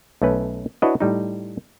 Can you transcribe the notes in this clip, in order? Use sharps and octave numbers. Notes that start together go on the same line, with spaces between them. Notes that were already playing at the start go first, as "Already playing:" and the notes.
B1 A3 C#4 B4
D4 E4 F#4 B4 C#5 D#5
A2 G3 D#4